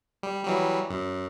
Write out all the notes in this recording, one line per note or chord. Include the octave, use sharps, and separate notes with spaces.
G3
E3 F#3 G3
F#2